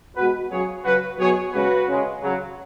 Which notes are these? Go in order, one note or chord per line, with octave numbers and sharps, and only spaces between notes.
B2 G#3 F#4 B4
C#3 F#3 G#4 C#5
C#3 F#3 F#4 B4
B2 F#3 G#4 C#5
C#3 G#3 F#4 B4
C#3 G#3
C#3 F#3